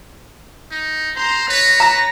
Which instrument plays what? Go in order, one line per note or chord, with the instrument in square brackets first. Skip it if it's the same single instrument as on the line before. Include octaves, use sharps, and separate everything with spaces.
[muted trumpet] D#4
[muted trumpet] C5 [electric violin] A#5 C6
[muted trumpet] B4 [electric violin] C#5 A#6
[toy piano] A#5